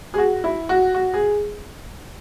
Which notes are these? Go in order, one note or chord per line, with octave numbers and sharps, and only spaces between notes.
G#4
F#4
E4
F#4
F#4
G#4